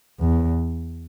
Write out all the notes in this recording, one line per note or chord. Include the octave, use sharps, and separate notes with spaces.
E2